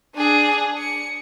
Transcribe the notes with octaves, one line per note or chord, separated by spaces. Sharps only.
D4 G#4
C#7